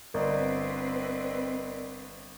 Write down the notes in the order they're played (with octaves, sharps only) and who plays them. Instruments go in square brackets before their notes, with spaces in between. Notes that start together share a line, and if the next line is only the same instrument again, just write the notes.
[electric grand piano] G1 [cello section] C4 B4 [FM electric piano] A#4 D5 D#5